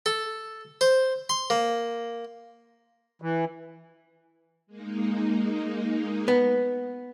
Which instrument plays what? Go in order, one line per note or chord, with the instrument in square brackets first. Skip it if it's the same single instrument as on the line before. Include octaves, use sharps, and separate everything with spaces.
[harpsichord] A4
C5
C6
A#3
[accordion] E3
[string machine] G#3 A#3 D#4
[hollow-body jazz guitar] B3